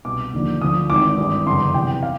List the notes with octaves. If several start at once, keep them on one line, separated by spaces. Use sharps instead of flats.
C2 B2 D6
D#2 D3 F3
D2 D3 F3 D#6
G#1 G#2 E3 D6
G#1 G2 E3
G1 F#2 C#3 E3 C6
E2 C3 E3 G5
F5